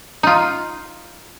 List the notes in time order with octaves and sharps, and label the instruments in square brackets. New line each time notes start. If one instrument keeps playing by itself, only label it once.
[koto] D#4 F4